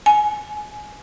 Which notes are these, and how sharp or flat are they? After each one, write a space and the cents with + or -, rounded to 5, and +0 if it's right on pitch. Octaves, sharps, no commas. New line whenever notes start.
G#5 +15